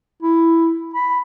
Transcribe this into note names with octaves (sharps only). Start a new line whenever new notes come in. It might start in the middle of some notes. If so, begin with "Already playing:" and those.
E4
B5